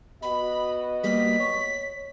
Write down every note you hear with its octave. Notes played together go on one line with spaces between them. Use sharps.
B3 F#4 D#5 B5
G3 A#3 B6
C#5